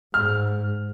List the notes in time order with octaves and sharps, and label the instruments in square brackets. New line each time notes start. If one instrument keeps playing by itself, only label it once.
[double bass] G#2 [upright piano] F6